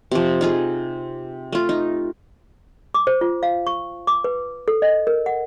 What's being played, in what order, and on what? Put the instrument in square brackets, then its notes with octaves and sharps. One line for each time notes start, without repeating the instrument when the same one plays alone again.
[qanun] C3 F3
D#4 F4 G#4
A3 F4
D#4
[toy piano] D6
C5
F4
F5
C#6
D6
B4
A4
D#5
A#4
F#5